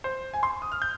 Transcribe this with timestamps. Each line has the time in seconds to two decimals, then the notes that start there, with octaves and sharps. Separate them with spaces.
0.04 C5
0.34 G#5
0.43 C6
0.62 D#6
0.72 F6
0.82 G6